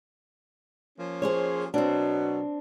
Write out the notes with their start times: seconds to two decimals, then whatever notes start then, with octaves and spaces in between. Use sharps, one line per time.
0.98 F3 A#3 C#4
1.22 G#4 C5 C#5
1.74 B2 F#3 C4 D4